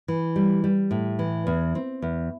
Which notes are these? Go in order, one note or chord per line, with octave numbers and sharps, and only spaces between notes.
E3
G3
G3
A2
E3
E2
C4
E2